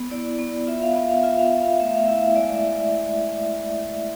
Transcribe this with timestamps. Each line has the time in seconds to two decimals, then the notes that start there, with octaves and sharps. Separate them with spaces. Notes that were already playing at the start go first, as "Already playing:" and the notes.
Already playing: B3
0.11 E4 D5
0.39 B3
0.67 F4 E5
0.82 F5
0.95 B3 E5
1.09 F5
1.23 F4 E5
1.38 F5
1.43 E5
1.51 B3
1.62 F5
1.80 A3 E5
1.94 F5
2.08 E4 E5
2.22 E5
2.36 G#3 D5
2.55 E5